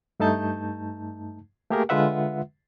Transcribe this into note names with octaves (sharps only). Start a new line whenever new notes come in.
G2 A3 D#4 A5 G6
A3 A#3 G4 G#4 A#4
D3 G#3 F4 B4 E5 F#5